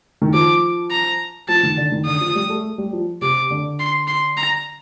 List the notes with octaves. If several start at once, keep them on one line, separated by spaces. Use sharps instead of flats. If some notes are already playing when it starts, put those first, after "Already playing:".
D#3
F3 D6
A#5
F3 A5
D#3
D3
D#3
D3 D#6
F3
G3
A3
A3
G3
F3
C3 D6
D3
C6
C6
A#5